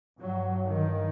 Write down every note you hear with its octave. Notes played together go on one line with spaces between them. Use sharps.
G2 F#3
D#3